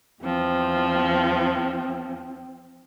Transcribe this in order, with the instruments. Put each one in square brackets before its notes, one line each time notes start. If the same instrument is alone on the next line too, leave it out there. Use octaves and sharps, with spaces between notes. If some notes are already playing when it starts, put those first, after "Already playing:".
[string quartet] E2 F3 [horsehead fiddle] C4